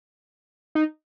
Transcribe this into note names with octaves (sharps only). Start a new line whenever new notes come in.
D#4